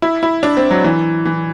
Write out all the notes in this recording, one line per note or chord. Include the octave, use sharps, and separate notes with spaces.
E4
E4
D4
C4
F#3
E3
E3